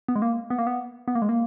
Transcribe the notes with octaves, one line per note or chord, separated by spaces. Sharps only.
B3
G#3
A#3
B3
A#3
B3
B3
A#3
G#3
A#3